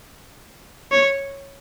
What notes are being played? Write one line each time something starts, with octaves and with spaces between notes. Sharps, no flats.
C#5